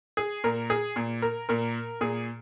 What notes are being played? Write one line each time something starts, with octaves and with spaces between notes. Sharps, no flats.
G#4
A#2 A#4
G#4
A#2
A#4
A#2 A#4
A#2 G#4